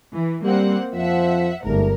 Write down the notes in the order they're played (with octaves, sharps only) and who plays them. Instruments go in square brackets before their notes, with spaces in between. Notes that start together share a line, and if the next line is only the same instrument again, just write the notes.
[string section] E3
[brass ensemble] G3 [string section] A#3 C4 F#5
[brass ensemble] F2 F3 C5 [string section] E5 F#5
[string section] G1 A#4 [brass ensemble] G#2 A3